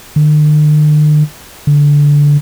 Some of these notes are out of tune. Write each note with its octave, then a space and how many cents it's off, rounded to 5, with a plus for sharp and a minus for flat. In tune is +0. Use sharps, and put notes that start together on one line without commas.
D3 +45
D3 -15